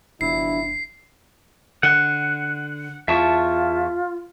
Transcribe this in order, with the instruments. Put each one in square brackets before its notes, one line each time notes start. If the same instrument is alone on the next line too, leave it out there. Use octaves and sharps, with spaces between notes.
[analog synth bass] F#1 [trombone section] B2 F3 E4 [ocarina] D4 [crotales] C7
[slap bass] D3 [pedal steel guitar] F#5
[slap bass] E2 [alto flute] F4 [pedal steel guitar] E5 A5 C#6